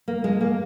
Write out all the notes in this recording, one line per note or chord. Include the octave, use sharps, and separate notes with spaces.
A#3
G#3
A#3